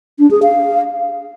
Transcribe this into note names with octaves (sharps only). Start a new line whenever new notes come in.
D4
G#4
F5